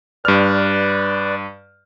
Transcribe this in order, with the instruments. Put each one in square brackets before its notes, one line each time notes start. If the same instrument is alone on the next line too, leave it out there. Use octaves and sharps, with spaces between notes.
[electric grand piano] G2 F6 [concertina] B4 D5